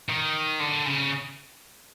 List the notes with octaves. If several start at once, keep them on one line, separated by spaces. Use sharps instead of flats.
D#3
D3
C#3